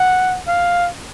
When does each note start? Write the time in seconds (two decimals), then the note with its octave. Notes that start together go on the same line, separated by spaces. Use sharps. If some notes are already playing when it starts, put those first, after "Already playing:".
Already playing: F#5
0.48 F5